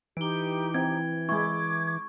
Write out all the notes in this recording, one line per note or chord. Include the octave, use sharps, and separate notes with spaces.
E3 D#4 G4 D7 G7
C4 G#6
G#3 E4 C#6 D6 G#6